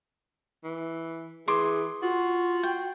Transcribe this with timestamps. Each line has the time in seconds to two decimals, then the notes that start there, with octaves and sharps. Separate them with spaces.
0.64 E3
1.48 E3 G#4 C6 D6
2.03 F4 F#4
2.63 G5